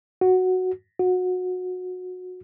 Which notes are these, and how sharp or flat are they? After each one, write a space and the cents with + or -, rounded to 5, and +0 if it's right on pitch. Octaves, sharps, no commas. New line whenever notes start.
F#4 +0
F#4 -20